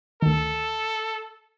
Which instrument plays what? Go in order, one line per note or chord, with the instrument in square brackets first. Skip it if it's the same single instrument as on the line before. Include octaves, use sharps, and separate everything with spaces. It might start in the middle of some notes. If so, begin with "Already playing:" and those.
[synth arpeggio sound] D2 D#3 [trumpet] A4